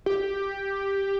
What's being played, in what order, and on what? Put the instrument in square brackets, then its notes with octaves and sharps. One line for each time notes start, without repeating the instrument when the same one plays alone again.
[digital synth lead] G4